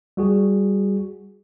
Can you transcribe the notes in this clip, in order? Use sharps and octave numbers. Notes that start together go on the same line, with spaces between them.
G3 F#4 G#4